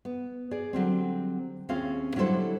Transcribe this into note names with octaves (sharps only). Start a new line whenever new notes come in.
B3
G#4 D5
D3 F#3 G3 C4
D#2 C4 C#4 F4 G#4 F5
D3 F#3 G3 E4 A4 C5